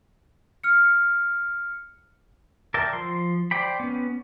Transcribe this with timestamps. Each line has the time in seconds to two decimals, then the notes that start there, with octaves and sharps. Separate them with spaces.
0.64 F6 C#7
2.74 A#4 D5 E5 G5 A5
2.93 F3 C6
3.51 C5 D5 G5 B5
3.80 B3 C#4